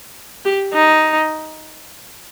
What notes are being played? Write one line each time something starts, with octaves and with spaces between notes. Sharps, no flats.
G4
D#4